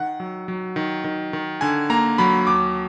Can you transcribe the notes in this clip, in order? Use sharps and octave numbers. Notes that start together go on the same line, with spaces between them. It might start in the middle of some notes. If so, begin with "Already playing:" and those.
Already playing: D#3 F#5
F#3
F#3
D#3
D#3
D#3
D3 G#5
A#3 A#5
F#3 B5
D#2 D6